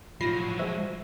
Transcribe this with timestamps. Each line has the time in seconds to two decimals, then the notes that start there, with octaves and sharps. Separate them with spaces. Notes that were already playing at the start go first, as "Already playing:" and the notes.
0.21 A2 F3 F#3 F4 A#6 C7
0.59 G#3 C5 E5